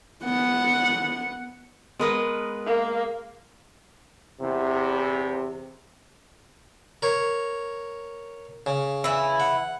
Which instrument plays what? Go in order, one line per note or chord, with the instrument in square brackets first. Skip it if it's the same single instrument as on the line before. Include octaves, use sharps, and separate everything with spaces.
[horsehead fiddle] B3 F#5
[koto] G#3 B4 D#5 [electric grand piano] B3 A#4
[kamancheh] A#3
[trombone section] E2 C3
[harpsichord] A#4 C#5
C#3
[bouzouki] E3 E4
[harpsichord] F#5